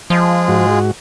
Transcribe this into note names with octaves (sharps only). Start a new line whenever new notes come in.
F3 G#3 F4 G#4
G#2 F#4